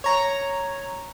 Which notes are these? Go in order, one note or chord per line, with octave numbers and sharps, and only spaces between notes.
C#5 A#5